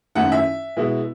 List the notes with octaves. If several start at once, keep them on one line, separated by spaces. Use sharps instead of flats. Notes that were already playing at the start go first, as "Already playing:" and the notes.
F#2 D#3 A3 C#4 E4 F#5
E5
B2 G#3 B3 E4